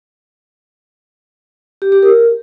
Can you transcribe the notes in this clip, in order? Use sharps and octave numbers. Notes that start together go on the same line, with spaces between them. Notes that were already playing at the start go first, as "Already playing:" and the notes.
G4
G4
A#4